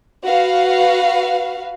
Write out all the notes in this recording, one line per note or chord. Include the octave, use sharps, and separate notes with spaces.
F#4 B4 F5